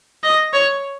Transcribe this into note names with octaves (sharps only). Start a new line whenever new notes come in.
D#5
C#5